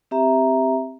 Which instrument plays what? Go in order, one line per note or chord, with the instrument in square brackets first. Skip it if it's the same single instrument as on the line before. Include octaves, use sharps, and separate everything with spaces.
[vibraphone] C4 G4 E5 A#5